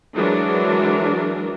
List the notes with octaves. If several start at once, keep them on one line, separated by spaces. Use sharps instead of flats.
E3 F#3 G#3 D4 A#4